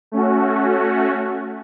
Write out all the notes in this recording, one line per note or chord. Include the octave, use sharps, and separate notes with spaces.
A3 C#4 F#4